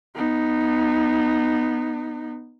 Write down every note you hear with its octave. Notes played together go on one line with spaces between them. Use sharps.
B3 D#4